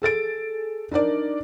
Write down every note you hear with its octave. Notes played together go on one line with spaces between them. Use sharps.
G#4 A4 A6 D7
D4 D#4 A#4 D5